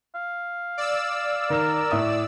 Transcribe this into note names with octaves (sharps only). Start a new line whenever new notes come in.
F5
D5 E6
D#3 A#4 E7
A2 E5 D#6